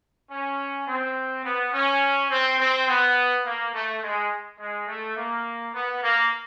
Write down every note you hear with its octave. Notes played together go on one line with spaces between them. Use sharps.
C#4
C4
B3
C#4
C4
C4
B3
A#3
A3
G#3
G#3
A3
A#3
B3
A#3